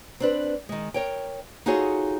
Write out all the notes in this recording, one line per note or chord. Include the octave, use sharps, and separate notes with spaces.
C4 D4 B4
D#3 G#3
A#4 C#5 G5
D#4 F4 F#4 G#4 A4 C#5